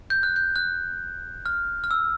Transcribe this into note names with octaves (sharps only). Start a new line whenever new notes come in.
G6
F#6
G6
F#6
F6
F6
E6